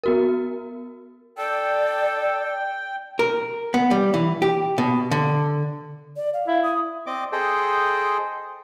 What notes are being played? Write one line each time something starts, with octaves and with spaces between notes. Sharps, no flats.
B3 F#4 A#4
A4 D5 G5
A#4
B3
G3
E3
G4
B2
D3
D5
F5
E4
D#6
C4 D5 D#5 D6
G#4 A4 C5 D#5 G5